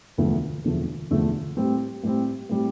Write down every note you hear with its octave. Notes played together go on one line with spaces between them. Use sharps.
E1 D2 D3 F3 A3
E1 D2 D3 F3 A3
E1 D2 D3 F3 A3
A2 G3 C4
A2 G3 C4
A2 G3 C4